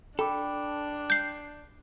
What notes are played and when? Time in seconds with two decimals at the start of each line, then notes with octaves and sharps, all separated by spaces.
0.19 D4 A4 G5 B5 D6
1.10 G6 C7